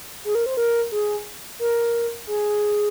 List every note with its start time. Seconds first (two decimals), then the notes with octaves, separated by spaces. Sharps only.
0.25 G#4
0.35 A#4
0.46 C5
0.57 A#4
0.92 G#4
1.59 A#4
2.27 G#4